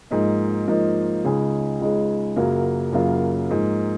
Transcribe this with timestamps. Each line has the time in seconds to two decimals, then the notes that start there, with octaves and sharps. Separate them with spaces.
0.11 G#2 F3 A#3 D#4
0.67 G#2 F3 A#3 D#4
1.24 C#2 C#3 G#3 D#4 G#4
1.80 C#2 C#3 G#3 D#4 G#4
2.36 F#2 C#3 F#3 A#3 F4
2.92 F#2 C#3 F#3 A#3 F4
3.50 G#2 F3 A#3